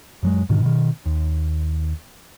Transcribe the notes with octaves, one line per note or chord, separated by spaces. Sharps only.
F#2 F#3 G#3
G#2 B2 D3 D#3
B2 D#3
D#2